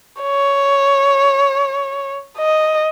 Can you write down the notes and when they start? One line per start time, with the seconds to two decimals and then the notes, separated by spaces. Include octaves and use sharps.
0.23 C#5
2.38 D#5